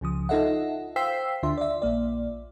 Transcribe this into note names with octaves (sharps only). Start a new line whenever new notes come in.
C#2 C#3 F3 D#6
D#4 F4 A4 D#5 E5 F#5
C5 F5 G5 E6 B6 C7
D2 D3 D4 F4 E5 C6
D5 E5
A#1 A#3 D5